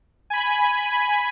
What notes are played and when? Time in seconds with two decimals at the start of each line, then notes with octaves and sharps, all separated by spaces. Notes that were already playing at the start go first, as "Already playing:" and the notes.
0.30 G#5 B5